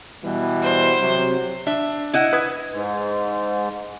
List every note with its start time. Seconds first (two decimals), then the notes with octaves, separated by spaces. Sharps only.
0.23 B2 E3 G3
0.63 C5
1.01 C3 F#3
1.67 D4 E5
2.13 E4 D#5 F#5
2.33 B4 D#6 G#6
2.72 G#2